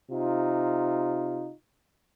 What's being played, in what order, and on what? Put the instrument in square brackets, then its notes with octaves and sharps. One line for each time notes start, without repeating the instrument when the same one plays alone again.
[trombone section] C3 D#4 F4